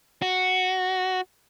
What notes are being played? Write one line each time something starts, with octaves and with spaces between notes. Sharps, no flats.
F#4